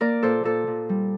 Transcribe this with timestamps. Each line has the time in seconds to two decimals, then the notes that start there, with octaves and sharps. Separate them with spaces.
0.01 A#3 A#4 D5
0.23 A#2 A4 C5
0.44 A#2 A4 C5
0.67 A#2
0.89 G3